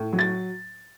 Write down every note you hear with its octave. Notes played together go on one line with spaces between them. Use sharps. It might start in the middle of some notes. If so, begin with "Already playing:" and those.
Already playing: A2
F#3
A6